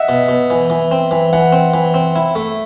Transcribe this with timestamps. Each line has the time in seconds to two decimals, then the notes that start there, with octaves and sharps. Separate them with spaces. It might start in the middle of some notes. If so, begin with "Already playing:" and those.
Already playing: D#5 E5 F#5
0.09 B2
0.28 B2
0.50 E3
0.70 E3
0.91 C4
1.11 E3
1.33 E3 F#5
1.52 C4
1.74 E3
1.94 C4
2.16 E4
2.35 A3